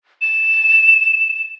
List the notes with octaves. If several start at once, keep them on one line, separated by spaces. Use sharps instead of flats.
E7